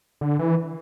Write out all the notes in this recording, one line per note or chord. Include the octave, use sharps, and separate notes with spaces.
D3
E3